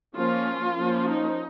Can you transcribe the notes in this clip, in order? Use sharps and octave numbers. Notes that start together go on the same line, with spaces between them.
F3 A#3 C#4 F4
F3 A#3 C#4
D#4